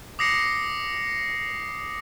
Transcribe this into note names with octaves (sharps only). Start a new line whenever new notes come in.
D6 D#6 A#6 C7 C#7